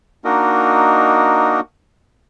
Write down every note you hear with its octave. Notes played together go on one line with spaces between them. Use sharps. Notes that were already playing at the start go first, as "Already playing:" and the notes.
A#3 D4 D#4 F#4 A#4 D#5